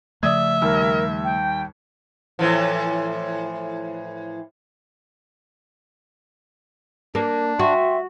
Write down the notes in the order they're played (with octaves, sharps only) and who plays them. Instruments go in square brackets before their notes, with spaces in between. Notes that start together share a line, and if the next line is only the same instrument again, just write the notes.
[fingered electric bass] C#3 F3 A3 [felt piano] D5 D#6 G#6 [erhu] E5
[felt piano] D#2 G3 E6 [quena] A#4
[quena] G5
[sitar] A2 E3 F3
[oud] A#3 [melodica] D4
[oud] F#4 [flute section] E5 G5 C6